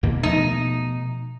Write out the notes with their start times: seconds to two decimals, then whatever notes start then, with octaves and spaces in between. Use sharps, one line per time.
0.03 D#2 B2 A#3
0.23 B2 F3 A3 D#4